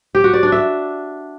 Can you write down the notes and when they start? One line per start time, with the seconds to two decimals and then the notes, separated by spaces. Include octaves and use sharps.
0.15 G4
0.24 F#4
0.33 D5
0.43 D4
0.52 E5